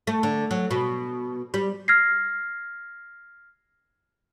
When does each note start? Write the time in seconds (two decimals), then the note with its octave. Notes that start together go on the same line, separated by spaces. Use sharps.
0.07 A3
0.23 D3
0.51 F#3
0.71 B2
1.54 G3
1.88 F6 G#6 A#6 C7